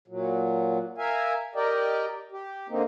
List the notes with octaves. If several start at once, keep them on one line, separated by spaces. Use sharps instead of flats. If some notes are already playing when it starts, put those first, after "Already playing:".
A#2 F#3
A#4 E5 F5 G#5
G4 A#4 D5 D#5 G5
G4
D3 A#3 C4 D#4